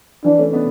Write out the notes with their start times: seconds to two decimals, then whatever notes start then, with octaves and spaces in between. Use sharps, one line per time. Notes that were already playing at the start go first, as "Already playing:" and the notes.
0.24 E3 D4
0.38 A3 C#4
0.53 B3 D4